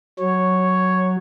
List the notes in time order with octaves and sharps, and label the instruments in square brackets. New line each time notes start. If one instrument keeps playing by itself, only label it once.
[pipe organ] F#3 [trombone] C#5